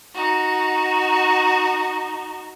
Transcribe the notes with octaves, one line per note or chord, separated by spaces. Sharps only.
D#4 F#4